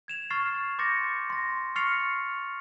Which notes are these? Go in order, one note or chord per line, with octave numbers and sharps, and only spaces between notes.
G#6 E7 F7
C#6 F6 A6 C7
C6 D6 G6 A6 A#6 C#7
C6 A#6
C#6 F6 A6 C7 C#7 F7